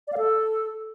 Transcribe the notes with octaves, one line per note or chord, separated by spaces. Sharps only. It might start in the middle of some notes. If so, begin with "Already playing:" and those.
D5
F5
A4